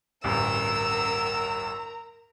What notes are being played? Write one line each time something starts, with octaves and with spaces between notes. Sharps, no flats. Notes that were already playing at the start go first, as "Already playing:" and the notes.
A1 D2 G2 A#4 A#5 E6